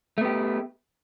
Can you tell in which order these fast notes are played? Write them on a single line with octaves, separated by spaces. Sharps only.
A3 B3 G4